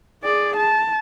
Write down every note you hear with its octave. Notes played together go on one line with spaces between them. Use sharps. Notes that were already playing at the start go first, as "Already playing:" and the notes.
G#4 D5
A5